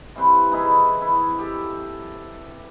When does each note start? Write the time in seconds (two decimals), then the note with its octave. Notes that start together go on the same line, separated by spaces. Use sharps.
0.16 E3 G3 C4 B4
0.51 E3 D#4 E4 G#4
1.02 E4
1.39 G4 A4